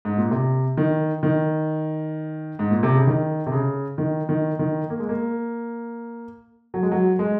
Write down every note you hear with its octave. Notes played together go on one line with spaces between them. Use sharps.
G#2
A#2
C3
D#3
D#3
G#2
A#2
C3
C#3
D#3
C3
C#3
D#3
D#3
D#3
A#3
G#3
A#3
F#3
G#3
F#3
G#3